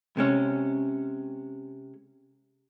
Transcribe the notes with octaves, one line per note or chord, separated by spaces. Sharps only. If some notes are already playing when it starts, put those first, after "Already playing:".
C3 G#3 C#4